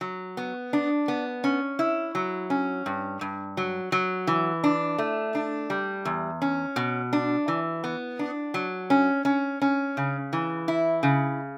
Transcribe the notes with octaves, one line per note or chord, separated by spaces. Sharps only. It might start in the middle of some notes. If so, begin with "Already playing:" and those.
F#3
B3
D4
B3
C#4
E4
F#3
C#4
G2
G2
F#3
F#3
E3
D4
A3
D4
G3
E2
C#4
B2
D4
E3
B3
D4
F#3
C#4
C#4
C#4
C#3
E3
E4
C#3